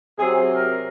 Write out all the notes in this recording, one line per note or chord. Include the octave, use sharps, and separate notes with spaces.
C3 F#3 C4 G#4
A#4